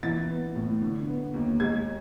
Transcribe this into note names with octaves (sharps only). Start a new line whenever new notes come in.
E3 A6
B3
A2
D3
B3
D#2
G#3 G#6